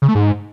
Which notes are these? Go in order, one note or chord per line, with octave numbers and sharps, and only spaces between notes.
C#3
A3
G#2